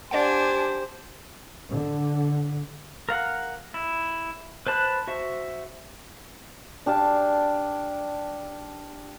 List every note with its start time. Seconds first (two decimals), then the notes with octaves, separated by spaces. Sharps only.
0.11 D4 G4 C5 D5 F#5 G#5
1.70 D3
3.09 A#4 F5 F#5
3.74 E4
4.67 B4 C5 A5 B5 F#6
5.07 F#4 C5 E5
6.86 D4 G4 F5 A5